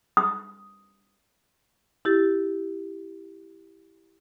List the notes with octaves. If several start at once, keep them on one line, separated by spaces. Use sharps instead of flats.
D#6
E4 G4 A6